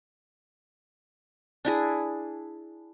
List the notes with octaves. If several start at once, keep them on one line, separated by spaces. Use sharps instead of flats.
D4 E4 G#4